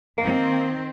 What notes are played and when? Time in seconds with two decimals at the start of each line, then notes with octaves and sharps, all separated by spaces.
0.18 D#3 A#3 C4